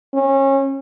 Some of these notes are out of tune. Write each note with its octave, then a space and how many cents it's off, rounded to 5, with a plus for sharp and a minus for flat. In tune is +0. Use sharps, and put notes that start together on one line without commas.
C#4 -30